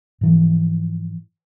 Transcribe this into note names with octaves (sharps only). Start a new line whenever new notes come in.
G#2 E3 F3